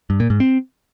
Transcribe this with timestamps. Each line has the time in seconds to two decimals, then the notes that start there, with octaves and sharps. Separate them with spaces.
0.10 G2
0.20 A#2
0.30 G#2
0.40 C4